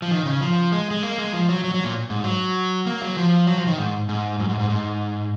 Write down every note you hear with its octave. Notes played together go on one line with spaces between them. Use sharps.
F3
D#3
C#3
F3
G#3
G#3
A#3
G#3
F3
F#3
F#3
F#3
A#2
G#2
F#3
A#3
F#3
F3
F#3
F3
D#3
G#2
G#2
F#2
G#2
G#2
G#2